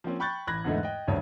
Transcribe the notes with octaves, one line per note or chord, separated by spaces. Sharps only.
F3 A#3 C4 C#4
G5 B5 C#6 F#6 G6 A6
A1 B5 F#6 G#6 A#6
E2 G#2 D3 E3 G#3 A3
D#5 G5
G#1 D2 G2 C#3 D4 C#5